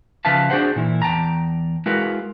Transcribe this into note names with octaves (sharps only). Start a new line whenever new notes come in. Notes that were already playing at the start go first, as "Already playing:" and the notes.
C#3 F3 B4 E5 F5 A5
D4 F#4 G#4 C5 F#5
A#2 E3 E4
E2 G5 A5 A#5
G#3 E4 F#4 A#4 B4 F5